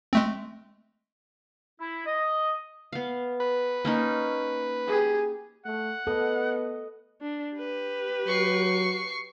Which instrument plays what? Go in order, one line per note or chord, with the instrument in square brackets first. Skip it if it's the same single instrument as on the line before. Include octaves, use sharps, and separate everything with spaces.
[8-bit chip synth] G#3 A3 C4
[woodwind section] E4
D#5
[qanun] B3 F5
[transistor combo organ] B4
[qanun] A#3 C#4 D#4
[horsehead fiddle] G4 G#4
[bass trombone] A3 [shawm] F#5
[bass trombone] B3 [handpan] A4 [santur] D#5
[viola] D4
G4 B4
[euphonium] F#3 [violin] C#6 C7